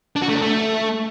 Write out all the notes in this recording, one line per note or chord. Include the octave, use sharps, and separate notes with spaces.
D4
F#4
A3
D4
A3